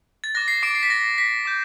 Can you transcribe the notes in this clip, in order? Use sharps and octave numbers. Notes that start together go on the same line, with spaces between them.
A6
D6 F#6 A#6
C7
D6 D7
C7
B6
A#6
B6
D6 G6